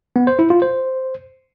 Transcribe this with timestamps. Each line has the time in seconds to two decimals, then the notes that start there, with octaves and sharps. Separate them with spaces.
0.16 B3
0.27 C5
0.39 E4
0.50 F4
0.62 C5